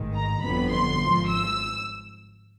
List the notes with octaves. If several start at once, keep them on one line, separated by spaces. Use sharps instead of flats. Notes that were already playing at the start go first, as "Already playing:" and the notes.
Already playing: A1 G#2 D#3
A#5
G1 F2 D3 F#3 B3 B5
C6
G#1 G#2 F3
E6